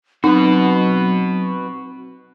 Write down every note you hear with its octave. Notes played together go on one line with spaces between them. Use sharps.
F#3 C4 D#4 F#4 B4